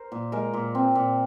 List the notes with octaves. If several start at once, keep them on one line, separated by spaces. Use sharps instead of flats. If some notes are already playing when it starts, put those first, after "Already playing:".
Already playing: A#4 C5
A#2
G#3 A#4
A#2
C4
A#2